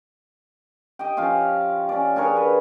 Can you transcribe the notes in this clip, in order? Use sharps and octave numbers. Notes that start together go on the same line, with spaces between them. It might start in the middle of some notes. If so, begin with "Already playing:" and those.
G4 D#5 G5
F3 C#4 F5
C#4 D5
D4 G#4 A#4 C#5
B4